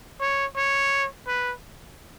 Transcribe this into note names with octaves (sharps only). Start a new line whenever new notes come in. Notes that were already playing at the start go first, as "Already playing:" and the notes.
C#5
C#5
B4